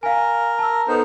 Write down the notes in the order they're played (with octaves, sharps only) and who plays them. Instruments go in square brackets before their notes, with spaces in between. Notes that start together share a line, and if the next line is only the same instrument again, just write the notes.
[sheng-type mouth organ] A#4 [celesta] F5 G#5
[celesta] A5 E6
[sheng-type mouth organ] B3 D#4 C5 [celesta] A4